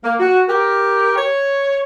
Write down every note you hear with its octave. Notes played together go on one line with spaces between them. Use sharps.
A#3
F#4
G4 A#4
C#5